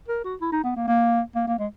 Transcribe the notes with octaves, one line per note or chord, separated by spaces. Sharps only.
A#4
F#4
E4
D#4
B3
A#3
A#3
A#3
A#3
G#3